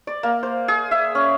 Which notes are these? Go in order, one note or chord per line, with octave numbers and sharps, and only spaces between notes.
D5
A#3
C5
G#4
E5
C#4